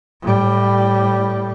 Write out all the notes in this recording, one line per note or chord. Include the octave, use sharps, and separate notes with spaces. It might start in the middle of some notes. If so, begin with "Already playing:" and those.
A2 G3